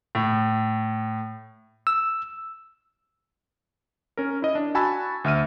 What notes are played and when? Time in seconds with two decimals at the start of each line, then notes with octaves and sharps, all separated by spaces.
0.15 A2
1.87 E6
4.17 C#4 A#4
4.42 E4 D#5
4.55 D4
4.75 F#4 G#5 A5 B5 E6
5.24 D2 E5 F6 D#7